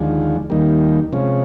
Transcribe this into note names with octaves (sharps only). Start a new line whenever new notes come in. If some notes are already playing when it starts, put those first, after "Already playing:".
Already playing: D#2 D3 F3 G#3
D#2 D#3 G3 A#3
C3 F3 G#3 C#4